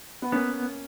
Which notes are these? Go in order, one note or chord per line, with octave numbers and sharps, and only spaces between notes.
B3
A#3 B3 C#4